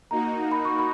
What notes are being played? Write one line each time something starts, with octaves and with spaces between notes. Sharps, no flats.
A#3 D#4 F#4 A#5
B5
C#6
B5